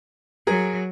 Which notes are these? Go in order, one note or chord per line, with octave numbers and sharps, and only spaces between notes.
F#3 G#4 A#4